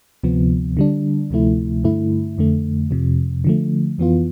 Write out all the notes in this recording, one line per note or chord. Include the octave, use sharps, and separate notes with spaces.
D2 C3 F3 B3
D3 G3 D4
D2 C3 F3 A3 E4
G2 D3 A3 E4
F2 D3 A3
F2 C3 F3
D3 F3 A3
F2 E3 B3 F4